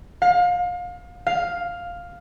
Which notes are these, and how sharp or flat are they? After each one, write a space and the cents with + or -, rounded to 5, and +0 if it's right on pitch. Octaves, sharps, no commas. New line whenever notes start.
F5 +30
F5 +5